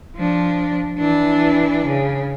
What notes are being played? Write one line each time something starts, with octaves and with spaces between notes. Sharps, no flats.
F3 D4
E3 D4
C#3